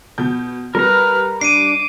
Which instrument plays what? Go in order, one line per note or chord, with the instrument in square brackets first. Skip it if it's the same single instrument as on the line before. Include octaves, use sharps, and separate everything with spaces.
[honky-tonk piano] B2 G6
[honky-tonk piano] G3 [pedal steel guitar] A#4 A#5 [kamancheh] B4 F6
[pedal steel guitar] D4 [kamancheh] D6 [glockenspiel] C7 D#7